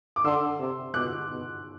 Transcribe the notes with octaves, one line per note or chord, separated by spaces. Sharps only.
D6
D3 C6 E6
C3
B2 D6 F#6
B2